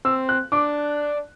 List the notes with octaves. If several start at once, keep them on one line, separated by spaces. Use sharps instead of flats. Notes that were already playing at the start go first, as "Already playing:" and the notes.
C4 E6
F#6
D4 D6